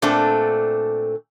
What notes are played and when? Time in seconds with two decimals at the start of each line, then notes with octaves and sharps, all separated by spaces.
0.02 A#2 A3 C4 D4 A4